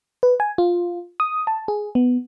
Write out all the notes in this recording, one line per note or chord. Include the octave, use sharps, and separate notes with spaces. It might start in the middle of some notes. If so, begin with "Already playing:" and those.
B4
G#5
F4
D#6
A5
G#4
B3